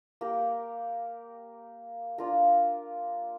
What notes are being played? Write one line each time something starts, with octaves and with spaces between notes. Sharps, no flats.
A#3 G4 A#4
D4 F4 A#4 F5